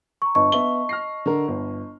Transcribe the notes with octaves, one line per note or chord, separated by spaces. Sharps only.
A#5 C#6
G1 D#5 A5 C#6
B3 E5 G7
F6 A#6 C7
D3 A#4
G1